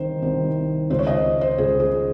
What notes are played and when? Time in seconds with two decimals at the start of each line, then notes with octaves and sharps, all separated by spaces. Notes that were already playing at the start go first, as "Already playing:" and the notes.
Already playing: C2 D#3 C5
0.22 C2 C3 D#3
0.90 C#2 C5
0.93 C#3
0.99 C#5
1.07 D#5
1.41 C5
1.58 C#2 C#3 G#4
1.80 G#4